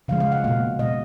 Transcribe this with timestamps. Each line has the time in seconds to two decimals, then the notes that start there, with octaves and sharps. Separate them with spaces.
0.08 C#3 F3 G#3 F5
0.20 F5
0.32 F#5
0.44 B2 A#3 F5
0.79 B2 G#3 D#5